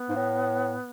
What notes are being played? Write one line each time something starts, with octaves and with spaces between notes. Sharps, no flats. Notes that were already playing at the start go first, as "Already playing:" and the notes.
Already playing: B3
G#2
A2